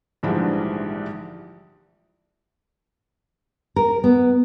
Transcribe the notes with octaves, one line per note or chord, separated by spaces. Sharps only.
A#1 G#2 D3 E3 F3 G3
A#4
B3